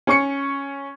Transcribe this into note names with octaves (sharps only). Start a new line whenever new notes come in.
C#4 C#6 C#7